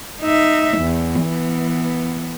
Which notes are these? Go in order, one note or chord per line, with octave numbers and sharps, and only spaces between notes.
D#4 E5
E2
E3 B3